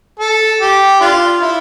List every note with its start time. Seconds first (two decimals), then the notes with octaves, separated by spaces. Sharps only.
0.20 A4
0.61 G4
1.01 D4 F4
1.41 E4